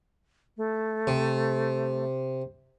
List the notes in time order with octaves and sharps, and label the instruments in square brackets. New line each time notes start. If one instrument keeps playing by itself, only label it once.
[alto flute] A3
[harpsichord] C3